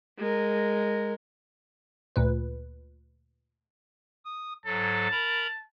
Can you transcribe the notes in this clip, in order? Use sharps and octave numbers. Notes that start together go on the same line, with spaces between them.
G#3 A#4
D2 A#2 B4
D#6
G#2 F#3 A4 A5
A#4 A#5 B5